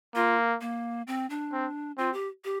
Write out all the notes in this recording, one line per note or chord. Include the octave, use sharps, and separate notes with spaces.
A#3 F4
A#3
C4
D4
C4
C4 F4
G4
G4